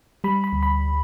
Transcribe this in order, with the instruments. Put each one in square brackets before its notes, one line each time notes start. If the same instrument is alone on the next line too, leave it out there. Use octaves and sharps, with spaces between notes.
[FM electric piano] G3 B5
B5
D2
B5